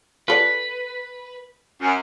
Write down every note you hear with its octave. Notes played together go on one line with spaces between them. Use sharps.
F4 A4 B4 D5
F#2